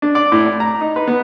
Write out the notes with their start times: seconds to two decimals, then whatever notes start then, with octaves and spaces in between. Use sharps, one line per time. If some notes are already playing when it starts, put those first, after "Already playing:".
0.02 D4
0.15 D5
0.32 A2
0.46 D5
0.60 A#5
0.81 D#4
0.96 B4
1.07 B3